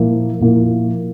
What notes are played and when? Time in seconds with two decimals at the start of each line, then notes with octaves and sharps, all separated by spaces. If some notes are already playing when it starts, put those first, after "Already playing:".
Already playing: A#2 F3 A#3 E4
0.40 A#2 F3 A#3 E4